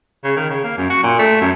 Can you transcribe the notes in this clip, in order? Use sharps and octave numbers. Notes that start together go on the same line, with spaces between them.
C#3
D#3
C#3
A#3
F#2
F#4
A#2
A3
F#2